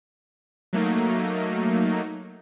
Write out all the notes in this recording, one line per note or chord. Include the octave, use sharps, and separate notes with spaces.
F#3 A3 A#3 D#4